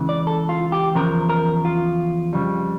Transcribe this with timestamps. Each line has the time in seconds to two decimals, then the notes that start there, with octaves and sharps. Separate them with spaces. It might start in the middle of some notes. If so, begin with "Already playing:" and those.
Already playing: C#2 C#3 E3
0.09 D5
0.27 A4
0.49 F4
0.72 G4
0.95 E2 C#3 F3 A#4
1.29 A#4
1.65 F4
2.33 F2 C#3 G3